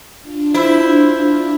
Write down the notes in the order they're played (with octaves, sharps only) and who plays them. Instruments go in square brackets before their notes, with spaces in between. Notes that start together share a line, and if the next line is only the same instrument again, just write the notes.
[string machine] D4 F4
[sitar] E4 [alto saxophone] C5